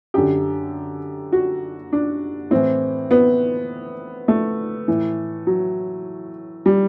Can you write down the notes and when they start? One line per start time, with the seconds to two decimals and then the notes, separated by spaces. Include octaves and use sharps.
0.14 F#2 D3 G4
1.32 F#4
1.93 D4
2.51 A2 E3 C4
3.11 B3
4.28 A3
4.88 A2 E3
5.47 F#3
6.66 G3